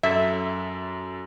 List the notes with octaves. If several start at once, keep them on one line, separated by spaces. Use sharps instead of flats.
F#2 A4 E5 A6